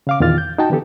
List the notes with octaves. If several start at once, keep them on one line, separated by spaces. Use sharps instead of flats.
C#3 F5 D6
E2 A#2 D#3 F4 F6 A6
G6
D#4 F#4 G5 A5
D3 E3 B3 G4 A4